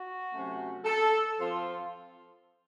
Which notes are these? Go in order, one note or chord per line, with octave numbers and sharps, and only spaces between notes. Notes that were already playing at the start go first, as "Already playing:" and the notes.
Already playing: F#4
C3 F#3 A3 C#4
A4
F3 C4 F4